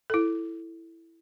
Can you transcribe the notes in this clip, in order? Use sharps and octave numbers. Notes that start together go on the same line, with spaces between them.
E4 A4